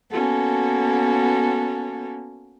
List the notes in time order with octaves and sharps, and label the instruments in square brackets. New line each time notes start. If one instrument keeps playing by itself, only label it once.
[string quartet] A#3 B3 C#4 F#4 A4